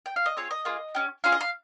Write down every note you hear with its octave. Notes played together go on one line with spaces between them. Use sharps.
G5
F5
D#5
C4 F4 G#4 C#5
D#5
A#3 F4 G#4
C#4 G4
C#4 F4 G#4 F5
D#5
F5